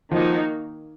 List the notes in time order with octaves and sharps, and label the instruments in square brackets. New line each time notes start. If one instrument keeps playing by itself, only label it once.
[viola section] D#3 A#3 D#4 F#4 [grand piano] F3